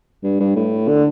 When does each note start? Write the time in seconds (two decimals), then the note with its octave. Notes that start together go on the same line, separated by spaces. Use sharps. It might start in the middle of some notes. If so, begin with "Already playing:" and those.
0.23 G2
0.40 G2
0.56 A2
0.88 D3